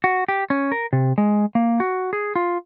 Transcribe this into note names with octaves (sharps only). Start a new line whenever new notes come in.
F#4
G4
C#4
A#4
C3
G#3
A#3
F#4
G#4
F4